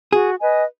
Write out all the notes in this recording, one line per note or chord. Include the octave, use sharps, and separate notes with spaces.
F#4 G#4
B4 D#5 G#5